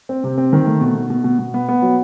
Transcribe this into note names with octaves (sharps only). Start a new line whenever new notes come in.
C4
C3
C4
D#3
A3
B2
B2
B2
B2
B2
B3
B3
F#3